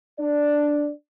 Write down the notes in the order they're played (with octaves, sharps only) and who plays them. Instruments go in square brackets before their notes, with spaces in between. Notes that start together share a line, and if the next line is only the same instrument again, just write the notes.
[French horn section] D4 D5